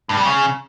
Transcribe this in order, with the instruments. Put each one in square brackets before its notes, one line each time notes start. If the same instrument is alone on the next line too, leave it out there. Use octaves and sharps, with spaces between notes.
[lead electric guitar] G2
G3
C#3